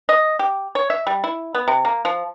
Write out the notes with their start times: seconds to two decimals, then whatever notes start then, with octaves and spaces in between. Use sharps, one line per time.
0.09 D#5
0.39 G4
0.75 C#5
0.90 E5
1.07 G3
1.24 E4
1.55 B3
1.68 C3
1.85 A#3
2.05 F3